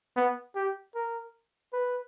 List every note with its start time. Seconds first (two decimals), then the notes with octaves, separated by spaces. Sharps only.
0.17 B3
0.56 G4
0.95 A#4
1.73 B4